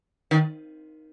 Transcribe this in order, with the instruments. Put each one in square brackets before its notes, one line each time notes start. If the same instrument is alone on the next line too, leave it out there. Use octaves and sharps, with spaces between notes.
[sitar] D#3